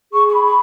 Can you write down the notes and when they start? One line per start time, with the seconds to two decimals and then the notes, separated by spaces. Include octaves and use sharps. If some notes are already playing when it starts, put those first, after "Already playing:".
0.12 G#4 C#6
0.27 C#6
0.34 B5
0.44 B5